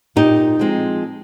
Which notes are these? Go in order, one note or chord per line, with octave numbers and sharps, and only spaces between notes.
A#2 D#4 G4
F3 G#3 C4